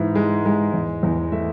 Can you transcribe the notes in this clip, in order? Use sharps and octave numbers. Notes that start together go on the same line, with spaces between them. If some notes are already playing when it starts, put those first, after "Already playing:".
Already playing: G#2 E3
G#3
G#3
E2
E2
A3 E5